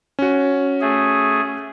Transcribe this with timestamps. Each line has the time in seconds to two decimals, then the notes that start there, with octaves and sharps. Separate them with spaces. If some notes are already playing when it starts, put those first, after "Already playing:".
0.19 C#4 F#4
0.81 A3 G#4